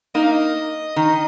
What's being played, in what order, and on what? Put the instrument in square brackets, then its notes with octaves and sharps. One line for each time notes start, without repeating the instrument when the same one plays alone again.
[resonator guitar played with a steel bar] A#3 D#4 [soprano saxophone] D#5
[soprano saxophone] F5
D#5
[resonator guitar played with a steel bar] D#3